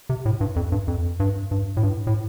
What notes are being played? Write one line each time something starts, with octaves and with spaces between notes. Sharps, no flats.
C3
A2
G2
F2
G2
F2
G2
G2
A2
G2
A2